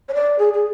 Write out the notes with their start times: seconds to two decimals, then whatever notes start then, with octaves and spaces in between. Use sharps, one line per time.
0.09 C#5
0.14 D5
0.39 G#4
0.53 G#4